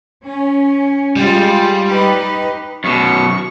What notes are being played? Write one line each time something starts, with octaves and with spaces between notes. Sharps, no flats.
C#4
G3 G#3 F4
D#4 G4 B4
F#2 B2 C#6